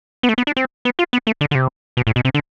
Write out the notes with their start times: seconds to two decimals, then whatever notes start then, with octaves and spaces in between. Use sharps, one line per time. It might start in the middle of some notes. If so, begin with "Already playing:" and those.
0.23 B3
0.29 A3
0.38 B3
0.47 D4
0.57 C4
0.85 B3
0.99 F4
1.13 B3
1.27 A3
1.41 D3
1.51 D3
1.55 C3
1.97 B2
2.07 A2
2.16 B2
2.25 C3
2.34 D3